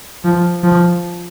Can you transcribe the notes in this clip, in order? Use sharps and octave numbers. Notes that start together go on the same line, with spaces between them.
F3
F3